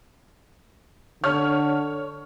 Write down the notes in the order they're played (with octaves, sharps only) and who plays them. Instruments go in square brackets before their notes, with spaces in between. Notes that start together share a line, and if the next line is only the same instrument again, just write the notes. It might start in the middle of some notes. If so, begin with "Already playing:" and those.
[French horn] D3 [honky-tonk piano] C#5 F6